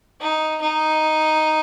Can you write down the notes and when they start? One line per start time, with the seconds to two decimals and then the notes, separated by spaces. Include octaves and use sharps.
0.21 D#4
0.61 D#4